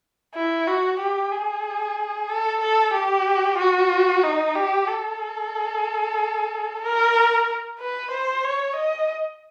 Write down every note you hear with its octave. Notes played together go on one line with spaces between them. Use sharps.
E4
F#4
G4
G#4
A4
A4
G4
F#4
D#4
G4
A4
A#4
B4
C5
C#5
D#5